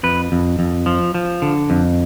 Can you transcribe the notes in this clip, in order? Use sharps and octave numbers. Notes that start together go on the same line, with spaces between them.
F2 B4
F2
F2
F3
F3
D3
F2